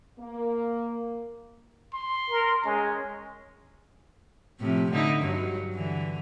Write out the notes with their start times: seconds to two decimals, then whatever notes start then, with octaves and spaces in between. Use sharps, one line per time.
0.19 A#3
1.94 C6
2.30 A#4
2.65 G#3 C#4
4.59 A2 C3 F3
4.91 D3 D#4 E4
5.23 G2 F#3
5.75 D3 E3